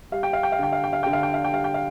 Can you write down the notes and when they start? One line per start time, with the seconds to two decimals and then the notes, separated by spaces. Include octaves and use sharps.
0.12 G3 F5
0.23 G5
0.33 F5
0.43 G5
0.52 F5
0.59 D3 G5
0.73 F5
0.84 G5
0.93 F5
1.03 D3 G5
1.13 F5
1.23 G5
1.34 F5
1.45 G5
1.52 G3 F5
1.64 G5
1.74 F5